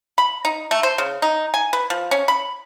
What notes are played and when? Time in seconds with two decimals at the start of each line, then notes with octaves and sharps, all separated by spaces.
0.18 B5
0.45 D#4
0.71 A3
0.83 C5
0.98 C#3
1.22 D#4
1.54 G#5
1.73 B4
1.90 F3
2.11 C#4
2.28 B5